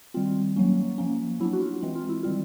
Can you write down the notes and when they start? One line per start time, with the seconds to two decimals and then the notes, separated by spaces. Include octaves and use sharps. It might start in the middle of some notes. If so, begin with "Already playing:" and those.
0.14 D#3 G3 C4 F4
0.56 F#3 A#3 C#4
0.98 F3 A#3 C#4
1.40 F#3 B3 D4 E4
1.53 F#4
1.61 F4
1.82 E3 G#3 C4
1.95 F4
2.09 E4
2.23 D#3 G3 C4 F4